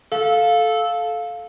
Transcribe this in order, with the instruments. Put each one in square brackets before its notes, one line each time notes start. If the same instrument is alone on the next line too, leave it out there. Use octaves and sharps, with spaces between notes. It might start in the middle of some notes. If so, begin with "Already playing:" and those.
[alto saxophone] A4 [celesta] F5